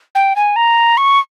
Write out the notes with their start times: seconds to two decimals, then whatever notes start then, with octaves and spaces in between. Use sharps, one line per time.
0.15 G5
0.36 G#5
0.56 A#5
0.97 C#6